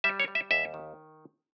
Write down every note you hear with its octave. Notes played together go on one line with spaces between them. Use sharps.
G3 E5
C#5
G3
E5
D#2 E5
D#3